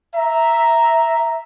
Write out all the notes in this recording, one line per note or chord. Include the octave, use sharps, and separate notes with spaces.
E5 A#5